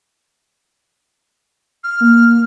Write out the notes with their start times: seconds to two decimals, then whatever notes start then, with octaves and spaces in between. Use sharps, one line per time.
1.84 F6
2.00 A#3